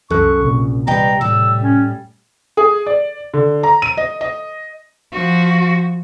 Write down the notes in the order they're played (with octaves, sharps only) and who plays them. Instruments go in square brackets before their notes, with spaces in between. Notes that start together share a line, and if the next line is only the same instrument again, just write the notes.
[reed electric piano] C2 A4 F#6 [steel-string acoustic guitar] F#2 [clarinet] C#6
[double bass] A#1 [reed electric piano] C3
[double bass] G3 [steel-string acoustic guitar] B4 D#5 G5 [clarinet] A#5
[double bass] A2 [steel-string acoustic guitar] G3 [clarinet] E6
[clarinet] C#4
[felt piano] G#4
D5
D3
A#5
D#7
D#5
D#5
[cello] F3 F#4